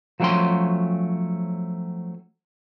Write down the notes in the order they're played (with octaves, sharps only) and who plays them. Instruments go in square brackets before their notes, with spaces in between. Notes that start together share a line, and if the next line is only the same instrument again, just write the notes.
[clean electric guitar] F3 F#3 A3 C#4 G5 C6